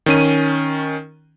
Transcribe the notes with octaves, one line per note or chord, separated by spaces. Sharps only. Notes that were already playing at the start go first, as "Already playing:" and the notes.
D#3 C#4 D#7